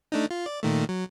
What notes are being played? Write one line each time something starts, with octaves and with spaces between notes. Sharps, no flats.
A3 D4 D#4
F4
D5
A#2 D#3 A3
F#3